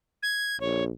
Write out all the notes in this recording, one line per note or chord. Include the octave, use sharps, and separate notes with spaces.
G#6
A#1 C#5